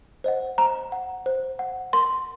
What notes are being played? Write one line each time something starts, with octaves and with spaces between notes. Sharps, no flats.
C5 D#5 F#5
C5 A#5
F#5
C5
F#5
A#4 C6